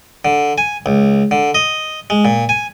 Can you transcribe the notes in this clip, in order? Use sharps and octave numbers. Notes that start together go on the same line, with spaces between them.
D3
G#5
C#2
D3
D#5
G#3
A#2
G#5